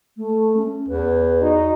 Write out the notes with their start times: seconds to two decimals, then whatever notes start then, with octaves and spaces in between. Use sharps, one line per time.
0.17 A3
0.57 C#4
0.89 E2 B4
1.42 D#4 F#4